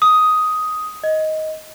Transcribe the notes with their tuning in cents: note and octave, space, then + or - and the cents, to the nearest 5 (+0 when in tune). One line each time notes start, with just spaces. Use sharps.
D#6 +5
D#5 +10